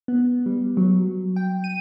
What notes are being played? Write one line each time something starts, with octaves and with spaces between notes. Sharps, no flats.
B3
G3
F#3
G5
D#7